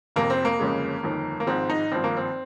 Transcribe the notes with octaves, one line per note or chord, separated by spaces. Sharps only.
F1 F2 C3 A#3
C4
A#3
G1 F2 C#3 G#3
G1 F2 D#3
A#3
G#1 G#2 F3 G#3 C4
D#4
G#1 G2 F3 C4
A#3
C4